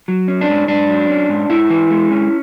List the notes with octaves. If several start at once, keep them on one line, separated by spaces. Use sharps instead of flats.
F#3
C#4
D4
G#2
G#2 D4
F#3
C#4
G#2
G#2 E4
E3
G#3
C#4